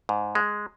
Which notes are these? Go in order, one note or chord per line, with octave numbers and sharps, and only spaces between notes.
G#2
G#3